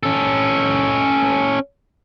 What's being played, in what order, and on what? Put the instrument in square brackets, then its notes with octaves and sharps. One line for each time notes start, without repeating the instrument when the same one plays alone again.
[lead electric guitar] C#4 A4